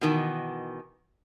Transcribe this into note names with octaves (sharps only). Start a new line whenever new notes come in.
B2 D#3 E3